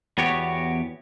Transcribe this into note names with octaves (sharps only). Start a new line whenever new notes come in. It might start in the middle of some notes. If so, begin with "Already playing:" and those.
E2 B3 F#4 G4 C#5